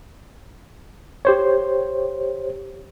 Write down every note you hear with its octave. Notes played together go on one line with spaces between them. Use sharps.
G4 C5 C#5